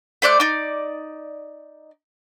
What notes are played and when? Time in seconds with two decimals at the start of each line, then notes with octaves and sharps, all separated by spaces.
0.22 A3 C5 D5 F#6
0.40 D#4 D5